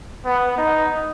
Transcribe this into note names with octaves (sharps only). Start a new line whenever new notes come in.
B3
D#4